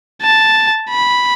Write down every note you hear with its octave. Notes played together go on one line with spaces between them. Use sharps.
A5
B5